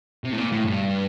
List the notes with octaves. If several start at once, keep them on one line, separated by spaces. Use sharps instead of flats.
C3
A2
A#2
A2
G2